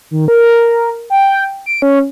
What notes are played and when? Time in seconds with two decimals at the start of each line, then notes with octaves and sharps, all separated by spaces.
0.11 D#3
0.28 A#4
1.10 G5
1.66 D7
1.82 C#4